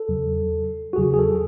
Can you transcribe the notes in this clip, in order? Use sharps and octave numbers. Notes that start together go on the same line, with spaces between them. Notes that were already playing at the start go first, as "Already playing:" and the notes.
Already playing: A4
E2 C#3 F#3
F#4
E2 C#3 F#3 G#4
G#4
A4